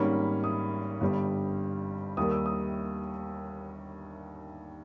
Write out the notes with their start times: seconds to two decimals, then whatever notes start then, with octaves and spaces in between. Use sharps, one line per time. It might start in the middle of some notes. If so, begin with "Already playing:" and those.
Already playing: G#1 G#2 G3 A#3 C#4 B5
0.44 D#6
1.01 G1 G2 G3
2.17 D#2 D#3 G3 A#3 D#6
2.31 E6
2.46 D#6